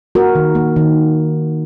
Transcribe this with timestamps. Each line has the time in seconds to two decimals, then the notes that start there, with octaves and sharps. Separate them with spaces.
0.15 A#3 F#4 A#4
0.35 D#3
0.55 A#3
0.76 D#3